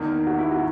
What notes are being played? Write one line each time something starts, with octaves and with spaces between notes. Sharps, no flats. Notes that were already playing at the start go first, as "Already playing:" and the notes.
Already playing: E2 D#3 A#3
F#4
E4
F#4